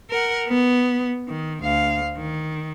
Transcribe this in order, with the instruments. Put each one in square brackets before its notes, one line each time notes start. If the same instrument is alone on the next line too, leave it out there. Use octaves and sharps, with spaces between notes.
[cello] A#4 F#5
B3
D#3
D2 F5
D#3